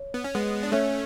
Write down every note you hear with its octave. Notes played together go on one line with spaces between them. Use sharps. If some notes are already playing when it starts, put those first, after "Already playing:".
Already playing: C#5
B3
C#4
G#3 B3
D4
A3 C#4 C#5 E5